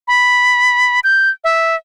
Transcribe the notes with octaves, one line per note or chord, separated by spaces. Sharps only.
B5
G6
E5